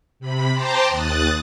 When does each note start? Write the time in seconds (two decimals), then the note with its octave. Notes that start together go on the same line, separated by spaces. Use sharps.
0.19 C3 B5
0.53 C5 G5 A5 A#5 C6 D6
0.89 D#2 D#6 F#6 A6